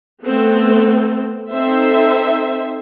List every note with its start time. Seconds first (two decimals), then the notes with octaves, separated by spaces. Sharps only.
0.23 A3 B3 C4 A4
1.53 C4 D#4 A4 C5 E5